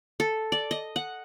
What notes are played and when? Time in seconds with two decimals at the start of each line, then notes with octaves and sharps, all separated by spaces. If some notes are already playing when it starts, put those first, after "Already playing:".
0.20 A4
0.52 D5
0.71 D#5
0.96 F#5